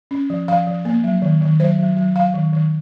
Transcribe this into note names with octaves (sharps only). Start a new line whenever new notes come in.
C#4
F3
F3 F5
F3
A#3
F#3
D#3
D#3
F#3 C5
F#3
F#3
F#3 F5
D#3
D#3